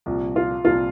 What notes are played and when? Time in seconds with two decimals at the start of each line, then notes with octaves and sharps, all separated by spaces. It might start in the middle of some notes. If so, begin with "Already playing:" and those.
0.06 C2 A#2 F3
0.36 F4
0.64 C2 A#2 F3 F4